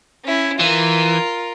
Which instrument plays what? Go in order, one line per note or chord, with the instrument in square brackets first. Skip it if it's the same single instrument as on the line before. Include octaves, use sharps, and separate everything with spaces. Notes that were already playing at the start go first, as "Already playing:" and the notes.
[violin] C#4 E4
[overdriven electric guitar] E3 [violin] F4 A#4